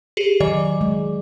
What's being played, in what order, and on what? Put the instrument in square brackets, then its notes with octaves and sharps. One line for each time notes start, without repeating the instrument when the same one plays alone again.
[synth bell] G4 G#4
[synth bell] D#3 D#5 [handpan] F#3 D5
[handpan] G#3